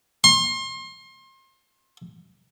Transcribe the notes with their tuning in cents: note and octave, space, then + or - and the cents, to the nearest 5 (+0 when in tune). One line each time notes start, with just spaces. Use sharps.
C6 +35